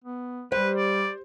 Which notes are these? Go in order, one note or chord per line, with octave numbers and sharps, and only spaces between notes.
B3
G3 G4 B4 C5
D5